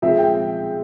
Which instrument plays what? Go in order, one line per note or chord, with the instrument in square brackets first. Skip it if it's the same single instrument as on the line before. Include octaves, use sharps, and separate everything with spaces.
[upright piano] F3 G#3 C4 [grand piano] E5
[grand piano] G5